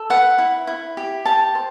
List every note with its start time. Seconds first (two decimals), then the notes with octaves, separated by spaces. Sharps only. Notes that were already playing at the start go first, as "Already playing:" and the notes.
Already playing: A4
0.10 B4 F#5
0.38 E4
0.67 E4
0.97 G4
1.25 G4 A5
1.55 C5